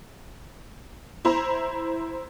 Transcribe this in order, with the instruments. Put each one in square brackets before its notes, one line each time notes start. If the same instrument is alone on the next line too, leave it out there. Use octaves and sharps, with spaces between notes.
[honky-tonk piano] E4 C5 A#5